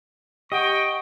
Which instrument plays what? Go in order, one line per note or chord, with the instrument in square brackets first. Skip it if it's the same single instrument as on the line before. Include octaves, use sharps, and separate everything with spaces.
[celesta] G4 F#5 D7 [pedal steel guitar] D#5 [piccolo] G5 [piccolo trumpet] C#6